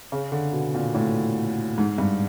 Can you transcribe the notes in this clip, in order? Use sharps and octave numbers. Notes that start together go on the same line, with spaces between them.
C#3
D3
B2
A#2
A2
G#2
G2